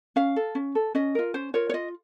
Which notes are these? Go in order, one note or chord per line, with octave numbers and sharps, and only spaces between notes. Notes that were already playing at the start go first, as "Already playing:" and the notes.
C#4 F5
A4
C#4
A4
C#4 D#5
F4 A#4
C#4 C5
F4 A#4 C#5
C#5
F4 D#5